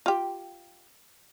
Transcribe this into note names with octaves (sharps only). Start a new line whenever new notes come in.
F4 G4